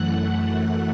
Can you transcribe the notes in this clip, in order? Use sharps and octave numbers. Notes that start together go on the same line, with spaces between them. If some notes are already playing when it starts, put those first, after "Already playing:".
Already playing: F#2 E3 A3 F#5 F#6
F#5 F#6